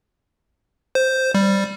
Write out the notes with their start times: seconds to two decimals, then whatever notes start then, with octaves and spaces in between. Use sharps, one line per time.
0.95 C5
1.34 G3